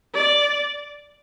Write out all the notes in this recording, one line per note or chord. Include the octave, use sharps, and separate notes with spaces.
D5